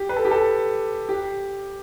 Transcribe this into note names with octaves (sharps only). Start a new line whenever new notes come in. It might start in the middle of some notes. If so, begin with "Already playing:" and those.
Already playing: G4
B4
A4
G4
A4
G4